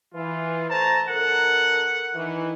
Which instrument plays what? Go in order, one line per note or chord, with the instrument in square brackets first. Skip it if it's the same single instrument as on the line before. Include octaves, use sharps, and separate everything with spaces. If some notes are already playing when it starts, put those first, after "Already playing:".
[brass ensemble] E3 [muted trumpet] F4
[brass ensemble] A3 C5 A#5 [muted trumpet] A5
[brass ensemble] B1 A4 A#4 [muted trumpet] F#5
[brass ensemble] D#3 E3